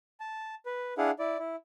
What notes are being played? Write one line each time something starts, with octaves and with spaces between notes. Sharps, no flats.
A5
B4
D4 E4 G#4 F5 F#5
E4 D5
E4